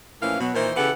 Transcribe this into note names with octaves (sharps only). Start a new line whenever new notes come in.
A2 E3 F3 A#3 C#4 F5
B2 F#3 B3
A#2 D#3 E3 A#4 C5
C#3 E3 G4 A4 B4 F#5